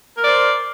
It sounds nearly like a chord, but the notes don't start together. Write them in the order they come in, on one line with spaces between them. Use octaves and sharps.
A#4 D5 C5